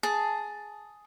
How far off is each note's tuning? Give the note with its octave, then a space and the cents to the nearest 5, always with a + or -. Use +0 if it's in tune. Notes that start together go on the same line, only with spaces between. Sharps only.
G#4 +5 A5 +0